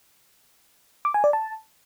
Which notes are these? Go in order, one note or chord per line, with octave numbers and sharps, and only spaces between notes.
D6
G#5
D5
A5